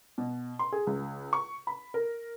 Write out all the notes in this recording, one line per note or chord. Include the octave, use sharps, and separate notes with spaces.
B2
C6
G#4
C#2
C#6
B5
A#4